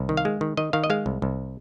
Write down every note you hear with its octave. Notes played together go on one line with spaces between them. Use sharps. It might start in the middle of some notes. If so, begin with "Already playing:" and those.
Already playing: C2
D#3
F5
G#3
D#3
D#3 D#5
D#3 F5
D#5
G#3 F5
C2
C2